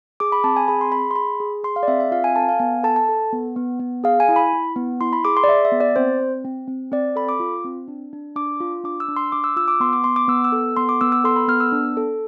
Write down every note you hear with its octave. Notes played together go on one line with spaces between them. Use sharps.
G#4 D6
B5
C4 A5
G#5
G#4 B5
C6
G#4 B5
C6
G#4 B5
G#4
G#4 C6
F5
D5
C4 E5
E5
F4 F5
G#5
A4 A5
F5
B3 G#5
A4 A5
A5
A4
B3
B3
B3
G#4 F5
G#5
E4
B5
E4
B3
E4 C6
B5
G#4 D6
C6
D5
G#4 E5
E5
B3
D5
C4 C5
C4
C4
C4
C4 D5
A4 B5
D6
F4
C4
D4
D4
D4 D6
F4
D4 D6
E6
D4
C6
D4 D6
E6
F4 E6
D6
B3 C6
D6
B3 C6
D6
B3 E6
E6
A4
B3 C6
D6
B3 E6
E6
A4 C6
B5
B3 F6
E6
D4
A4